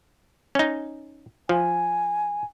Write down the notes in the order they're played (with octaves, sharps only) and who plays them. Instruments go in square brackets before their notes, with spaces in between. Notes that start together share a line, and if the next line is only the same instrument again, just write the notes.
[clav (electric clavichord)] C#4 D#4
[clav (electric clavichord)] F3 [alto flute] G#5